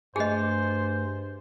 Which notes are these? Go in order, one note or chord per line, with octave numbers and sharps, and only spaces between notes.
G2 A3 G4 G#4 C5 D#5 G#5